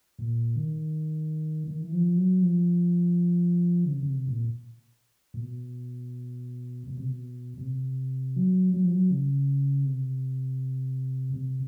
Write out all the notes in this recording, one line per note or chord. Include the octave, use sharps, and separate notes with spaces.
A#2
D#3
D#3
E3
F3
F#3
F3
D3
C#3
C#3
C3
A#2
A#2
B2
B2
C3
B2
B2
C3
F#3
F#3
F3
F#3
C#3
C3
C3